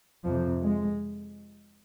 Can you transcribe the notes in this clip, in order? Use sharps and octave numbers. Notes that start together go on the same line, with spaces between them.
F2 C3 F3
G#3